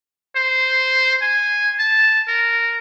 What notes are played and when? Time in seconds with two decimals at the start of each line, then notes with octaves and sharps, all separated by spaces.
0.36 C5
1.22 G#5
1.79 A5
2.28 A#4